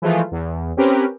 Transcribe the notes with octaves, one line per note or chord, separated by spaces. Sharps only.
E3 F3 G#3 A3 F4
E2
C4 C#4 G4 A#4 B4